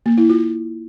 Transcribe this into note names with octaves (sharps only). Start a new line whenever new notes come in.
A#3
E4
F4